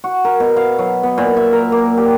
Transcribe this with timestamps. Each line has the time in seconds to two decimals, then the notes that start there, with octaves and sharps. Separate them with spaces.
0.04 F#4
0.25 A#4
0.40 B2
0.57 F5
0.78 F#3
1.03 B3
1.18 A#2
1.37 E5
1.53 A#4
1.72 A#3
1.97 G4